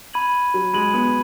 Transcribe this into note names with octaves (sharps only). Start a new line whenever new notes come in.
B5 G#6 D#7 F#7
F#3
G#3 B5 G#6 D#7 F#7
B3